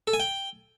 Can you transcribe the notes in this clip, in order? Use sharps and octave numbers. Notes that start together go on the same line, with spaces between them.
A4
G#5
G5